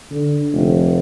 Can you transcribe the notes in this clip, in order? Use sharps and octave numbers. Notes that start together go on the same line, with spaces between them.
D3
F1